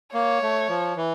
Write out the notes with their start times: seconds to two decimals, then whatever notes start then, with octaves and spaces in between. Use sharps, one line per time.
0.14 A#3 C#5
0.43 A3
0.69 F3
0.96 E3